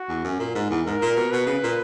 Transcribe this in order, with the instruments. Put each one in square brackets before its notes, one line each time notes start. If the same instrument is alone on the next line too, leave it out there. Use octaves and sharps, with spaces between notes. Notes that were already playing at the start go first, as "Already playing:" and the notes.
Already playing: [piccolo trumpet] F#4
[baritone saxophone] E2
F#2
A#2
G#2
E2
[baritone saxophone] G#2 [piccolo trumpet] A#4
[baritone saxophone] A#2
B2
[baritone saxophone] B2 [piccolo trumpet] B4
[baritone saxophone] C#3
A#2